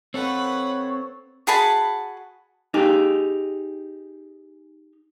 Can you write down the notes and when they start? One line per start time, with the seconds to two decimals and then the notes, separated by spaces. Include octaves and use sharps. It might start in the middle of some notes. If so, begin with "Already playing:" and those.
0.14 C4 A4 B4 C#5 F#5
1.47 F#4 G#4 A5 B5
2.74 D#4 G4 G#4